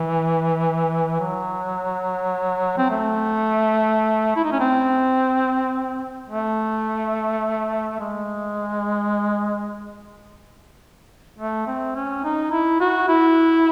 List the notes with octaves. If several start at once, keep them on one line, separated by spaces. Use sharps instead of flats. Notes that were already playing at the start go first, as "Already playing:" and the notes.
Already playing: E3
F#3
C4
A3
E4
D#4
C#4
C4
A3
G#3
A3
C4
C#4
D#4
E4
F#4
E4